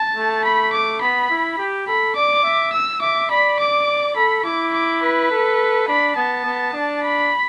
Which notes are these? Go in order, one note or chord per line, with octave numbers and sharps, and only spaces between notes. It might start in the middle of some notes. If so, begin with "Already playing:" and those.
Already playing: A5
A3
B5
D6
B3 B5
E4
G4
A4 B5
D5 D6
E5
E6
E5 D6
D5 B5
D6
A4 B5
E4 D6
D6
B4
A4
D4 B5
B3 A5
B3
D4
B5